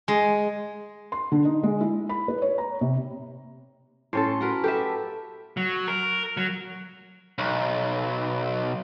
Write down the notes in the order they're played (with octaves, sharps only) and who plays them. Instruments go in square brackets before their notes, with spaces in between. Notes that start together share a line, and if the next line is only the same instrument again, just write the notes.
[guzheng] G#3
[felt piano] C6
D3
D#4
G#3
E4
B5
B4
C#5
A#5
C3
[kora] A2 C#4 A4 [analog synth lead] C6
[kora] F#4 A#4 B4
[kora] G4 B4 E5 [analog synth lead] A4
[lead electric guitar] F#3
A#4
F#3
B1